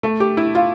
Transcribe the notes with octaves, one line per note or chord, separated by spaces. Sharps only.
A3
G4
E4
F4